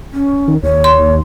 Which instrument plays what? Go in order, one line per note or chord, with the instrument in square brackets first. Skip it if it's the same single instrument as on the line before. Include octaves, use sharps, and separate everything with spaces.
[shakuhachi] C#4
[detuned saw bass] D#3
[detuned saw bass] D#2 [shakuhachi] C#5
[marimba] C6